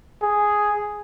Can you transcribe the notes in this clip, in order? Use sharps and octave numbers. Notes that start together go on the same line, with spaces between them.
G#4